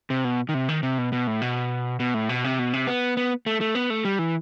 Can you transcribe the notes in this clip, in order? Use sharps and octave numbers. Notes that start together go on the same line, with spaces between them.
C3
B2
D#3
C3
D#3
C3
B2
B2
A2
B2
B2
A2
B2
C3
B2
C3
B3
B3
A3
A3
B3
A3
G3
E3